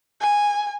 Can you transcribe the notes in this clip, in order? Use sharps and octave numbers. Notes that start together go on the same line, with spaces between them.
G#5